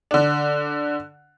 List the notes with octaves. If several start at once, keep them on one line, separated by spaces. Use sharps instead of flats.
D3 D4